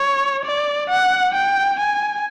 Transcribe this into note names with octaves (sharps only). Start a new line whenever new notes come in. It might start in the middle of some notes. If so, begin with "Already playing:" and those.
Already playing: C#5
D5
F#5
G5
G#5